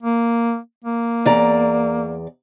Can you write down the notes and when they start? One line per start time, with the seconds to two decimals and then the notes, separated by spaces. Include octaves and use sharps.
0.03 A#3
0.84 A#3
1.25 E2 D5 A#5